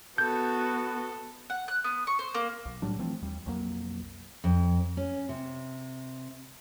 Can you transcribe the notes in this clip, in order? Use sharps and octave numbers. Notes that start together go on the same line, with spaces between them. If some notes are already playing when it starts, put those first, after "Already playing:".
B3 F#4 A4 G6
F#5
F#6
B3
C#6
C5
A#3
B1
A2 F#3 G3 D4
E3 F3 A3 C4
D#2 G3
B1 F2 F#3 A#3
F2
C#4
C3